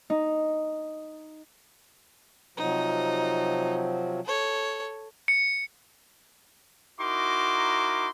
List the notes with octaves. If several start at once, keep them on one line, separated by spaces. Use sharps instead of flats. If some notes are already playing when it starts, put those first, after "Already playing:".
D#4
C3 F3 F#3 D#4
A4 C#5
C#7
D#4 E4 F#4 A#4 C6 D6